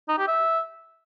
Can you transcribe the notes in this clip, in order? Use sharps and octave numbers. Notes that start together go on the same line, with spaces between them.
D#4
G4
E5